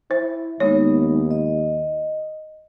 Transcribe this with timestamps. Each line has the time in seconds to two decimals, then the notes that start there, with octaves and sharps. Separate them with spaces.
0.11 E4 C5
0.60 D#2 G#3 B3 D#4 C#5
1.31 D#5